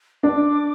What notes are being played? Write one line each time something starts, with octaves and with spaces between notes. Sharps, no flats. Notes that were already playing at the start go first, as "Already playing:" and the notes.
D4 D6